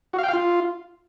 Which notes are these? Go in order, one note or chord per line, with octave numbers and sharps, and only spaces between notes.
F#4
F5
G5
F5
F4